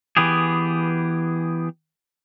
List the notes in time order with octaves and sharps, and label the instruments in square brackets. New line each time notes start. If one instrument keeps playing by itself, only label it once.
[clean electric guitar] E3 B3 G4 G#4